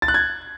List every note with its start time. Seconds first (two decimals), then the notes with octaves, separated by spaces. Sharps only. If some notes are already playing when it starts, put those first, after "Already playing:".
0.02 A6
0.08 F#6
0.14 G#6